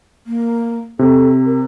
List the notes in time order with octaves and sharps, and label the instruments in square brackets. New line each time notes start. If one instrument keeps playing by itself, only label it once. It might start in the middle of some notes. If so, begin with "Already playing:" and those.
[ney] A#3
[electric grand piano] C3 [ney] A4
[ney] A#4